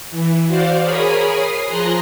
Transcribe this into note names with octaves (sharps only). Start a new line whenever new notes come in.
E3
F#4 C5 D5 F5
G#4 A#4 C#5 G#5 B5 D#6
D#6 C7
F3 G#4 A#5 C6 F#6 A#6